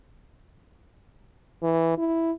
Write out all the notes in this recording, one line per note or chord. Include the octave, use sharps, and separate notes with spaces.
E3
E4